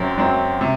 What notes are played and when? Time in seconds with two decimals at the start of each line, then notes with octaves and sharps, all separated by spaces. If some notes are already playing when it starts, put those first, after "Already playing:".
Already playing: F#2 F#3 C4
0.18 F#2 F#3 C4
0.61 C3